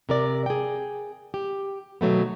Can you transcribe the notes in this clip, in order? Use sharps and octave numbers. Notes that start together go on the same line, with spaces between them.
C3 A#4 D5
G#4 G5
G4
B2 D#3 F#3 A3 B3